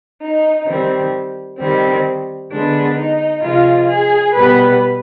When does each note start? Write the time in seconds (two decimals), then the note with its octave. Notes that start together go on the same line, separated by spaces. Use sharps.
0.20 D#4
0.67 D#3 G3 C4
1.58 D#3 G3 C4
2.51 D3 G#3 B3 D4
2.97 D#4
3.42 C3 F3 G#3 F4
3.88 G#4
4.33 B2 G3 B3 B4